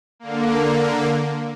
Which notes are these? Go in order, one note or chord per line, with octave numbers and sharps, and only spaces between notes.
D3 A#3